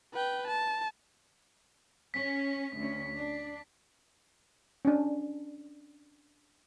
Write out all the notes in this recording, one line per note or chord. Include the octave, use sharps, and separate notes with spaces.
B4 G5
A5
C#4 B6
D2 C#4
D4
C#4 D4